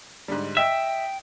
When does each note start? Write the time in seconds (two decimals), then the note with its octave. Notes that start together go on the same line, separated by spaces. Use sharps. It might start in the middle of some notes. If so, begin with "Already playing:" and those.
0.28 G#2 D3 G3
0.57 D#5 E5 G5